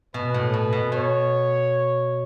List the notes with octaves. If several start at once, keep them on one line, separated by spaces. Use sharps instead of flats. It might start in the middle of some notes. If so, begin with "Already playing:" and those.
B2 B4
A2
B2
B2
B2 C#5